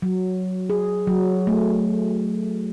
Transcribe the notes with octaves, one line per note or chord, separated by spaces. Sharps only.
F#3
G#4
F#3
A3